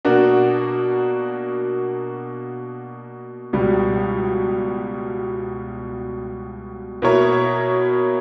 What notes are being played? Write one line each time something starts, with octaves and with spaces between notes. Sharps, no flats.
B2 A#3 D4 F#4
C#2 B2 G3
B2 A#3 E4 A#4 C#5